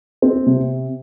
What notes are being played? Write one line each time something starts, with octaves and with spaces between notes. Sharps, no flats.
C4
C3